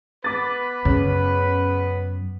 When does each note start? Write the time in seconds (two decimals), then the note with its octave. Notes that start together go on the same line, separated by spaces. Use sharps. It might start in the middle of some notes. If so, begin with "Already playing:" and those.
0.24 B3 B4 D6 A6
0.85 F#2 C#3